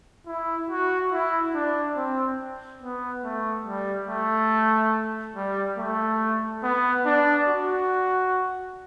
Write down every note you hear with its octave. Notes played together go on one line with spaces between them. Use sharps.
E4
F#4
E4
D4
C4
B3
A3
G3
A3
G3
A3
B3
D4
F#4